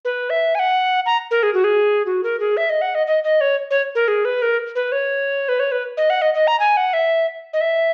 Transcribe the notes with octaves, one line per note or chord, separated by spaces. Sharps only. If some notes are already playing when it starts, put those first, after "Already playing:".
B4
E5
G#5
F#5
A#5
A#4
G#4
F#4
G#4
F#4
A#4
G#4
E5
D#5
F#5
D#5
D#5
D#5
C#5
C#5
A#4
G#4
B4
A#4
B4
C#5
B4
C#5
B4
D#5
F#5
D#5
D#5
A#5
G#5
F#5
E5
D#5
E5